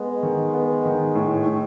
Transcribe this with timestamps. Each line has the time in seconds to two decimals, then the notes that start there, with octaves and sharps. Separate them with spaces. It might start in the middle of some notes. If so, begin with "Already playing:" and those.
Already playing: G#3 B3
0.23 D#3
0.54 B3
0.85 D#3
1.15 A2
1.46 A2